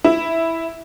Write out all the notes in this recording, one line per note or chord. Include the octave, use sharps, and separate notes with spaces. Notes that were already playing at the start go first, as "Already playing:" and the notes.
E4